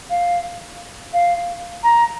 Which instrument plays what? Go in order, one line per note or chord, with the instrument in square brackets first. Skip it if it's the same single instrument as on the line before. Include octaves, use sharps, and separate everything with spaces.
[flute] F5
F5
A#5